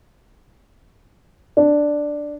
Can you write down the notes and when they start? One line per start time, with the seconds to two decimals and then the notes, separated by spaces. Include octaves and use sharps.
1.57 D4